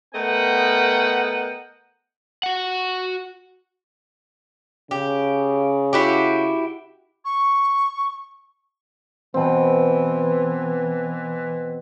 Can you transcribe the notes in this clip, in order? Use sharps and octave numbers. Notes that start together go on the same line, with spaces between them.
A3 B3 A#4 D#5 F#5 G5
F#4 F#5
C#3 G4
E4 F#4 G4
C#6
B2 E3 C4